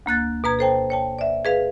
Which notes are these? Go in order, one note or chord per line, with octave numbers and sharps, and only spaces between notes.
D2 A#3 F#6 A6
B2 B4 A#5 G#6
A4 C5 G5 A5
C#5 G5 A5
D5 E5
G#4 B4 F5